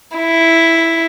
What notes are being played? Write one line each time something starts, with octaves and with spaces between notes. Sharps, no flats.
E4